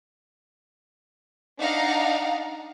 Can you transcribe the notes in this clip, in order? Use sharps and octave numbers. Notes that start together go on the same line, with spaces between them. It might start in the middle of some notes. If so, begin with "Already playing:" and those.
D4 D#4 F5 F#5 A#5